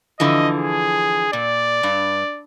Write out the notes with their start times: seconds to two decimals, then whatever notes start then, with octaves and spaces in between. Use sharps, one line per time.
0.20 D3 E3 F3 D#5
0.59 G#4
1.33 A#2 D5
1.83 G2